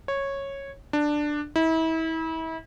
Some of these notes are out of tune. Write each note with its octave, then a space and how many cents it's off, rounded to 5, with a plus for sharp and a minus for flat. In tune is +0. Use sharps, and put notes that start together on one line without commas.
C#5 -10
D4 +10
E4 -35